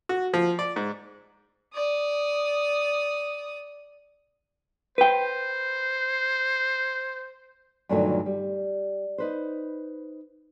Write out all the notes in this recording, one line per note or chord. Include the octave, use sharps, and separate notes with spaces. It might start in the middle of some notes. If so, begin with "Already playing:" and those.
F#4
F3
D5
G#2
D5 D#6
B4 C5 G5
G2 A#2 D3 D#3 F#3 A3
G3
D#4 B4 C5